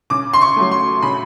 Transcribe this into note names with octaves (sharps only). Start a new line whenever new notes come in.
C#3 D6
C6
C#6
F#3 A3
C6
C#3 B5